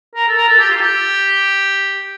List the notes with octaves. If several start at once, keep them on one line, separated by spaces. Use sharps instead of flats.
A#4
A4
A#4
A4
G4
F4
A4
G4